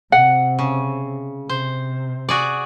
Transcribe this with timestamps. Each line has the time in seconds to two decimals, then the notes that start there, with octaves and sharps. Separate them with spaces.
0.12 C3 C4 F#5
0.59 C#3
1.49 C3 C5
2.29 F#4 G#4 D5